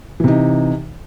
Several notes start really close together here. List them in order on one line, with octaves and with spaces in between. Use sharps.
E3 C3 D#4